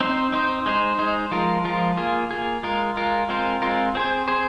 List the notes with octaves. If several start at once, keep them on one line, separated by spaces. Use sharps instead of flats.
C4 D#4 C5
C4 D#4 C5
G#3 D#4 C5
G#3 D#4 C5
F3 G#3 F4 A#4
F3 G#3 F4 A#4
A#3 F4 G#4
A#3 F4 G#4
G#3 F4 A#4
G#3 F4 A#4
G#3 C4 F4 A#4
G#3 C4 F4 A#4
C4 G#4 C5
C4 G#4 C5